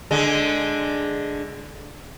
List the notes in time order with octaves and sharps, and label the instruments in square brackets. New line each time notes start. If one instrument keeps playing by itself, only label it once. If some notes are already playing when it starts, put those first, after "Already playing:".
[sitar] D3 G#3